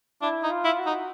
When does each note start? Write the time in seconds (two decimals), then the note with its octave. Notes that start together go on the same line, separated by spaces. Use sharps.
0.22 D4 E4
0.43 D#4
0.50 F4
0.64 E4
0.79 F#4
0.86 D#4